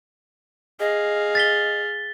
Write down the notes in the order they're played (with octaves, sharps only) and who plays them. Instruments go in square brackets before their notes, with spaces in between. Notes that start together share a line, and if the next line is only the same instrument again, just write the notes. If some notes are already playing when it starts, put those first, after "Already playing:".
[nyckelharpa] G#4 F5 [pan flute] D#5
[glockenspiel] A6 B6 G7